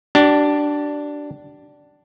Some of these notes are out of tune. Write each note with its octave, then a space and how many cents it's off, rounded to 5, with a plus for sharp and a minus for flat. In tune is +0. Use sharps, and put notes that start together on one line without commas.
D4 +0 G4 -40